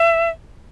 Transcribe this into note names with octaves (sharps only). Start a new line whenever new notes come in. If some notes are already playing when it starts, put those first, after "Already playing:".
Already playing: E5